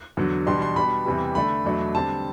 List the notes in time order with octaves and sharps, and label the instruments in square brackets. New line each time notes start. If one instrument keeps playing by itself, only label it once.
[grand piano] E2 D3 F#3
E2 B2 G3 D4 C6
C6
B2 G3 D4 B5
E2 C3 E3 G3
D3 A3 D4 B5
E2 B2 F#3 A3 D4
D3 G3 C4 A5